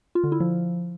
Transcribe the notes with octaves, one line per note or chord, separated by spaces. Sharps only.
F4
D3
E4
F3